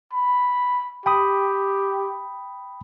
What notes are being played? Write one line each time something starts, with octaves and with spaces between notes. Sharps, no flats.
B5
G4 G5 B5 D#6